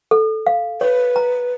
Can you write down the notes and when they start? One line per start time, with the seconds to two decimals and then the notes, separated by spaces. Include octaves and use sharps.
0.11 A4
0.47 F5
0.81 B4 C#5
1.16 A#5